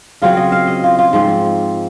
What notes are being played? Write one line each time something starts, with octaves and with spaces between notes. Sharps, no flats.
C#3 F#3 C4 F4
D#5
F5
D#5
F4
F4
G#2 F3 C4